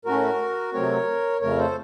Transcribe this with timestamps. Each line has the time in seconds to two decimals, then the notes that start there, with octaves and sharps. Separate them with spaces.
0.05 A2 A3 C#4 F#4 A#4
0.73 C3 F#3 A3 C4 A#4 C#5
1.41 F2 C#3 A3 A#4 C#5
1.58 A4 C5